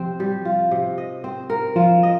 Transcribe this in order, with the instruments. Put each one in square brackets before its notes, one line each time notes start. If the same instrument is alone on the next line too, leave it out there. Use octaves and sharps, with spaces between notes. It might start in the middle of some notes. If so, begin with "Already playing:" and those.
Already playing: [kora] C3 C4 [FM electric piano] F3
[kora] G3
F4
C3
D#5
C4
A#4
[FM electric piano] F3 [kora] F4
[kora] D#5